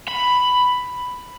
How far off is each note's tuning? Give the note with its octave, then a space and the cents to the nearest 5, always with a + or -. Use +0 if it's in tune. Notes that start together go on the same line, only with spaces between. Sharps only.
B5 +5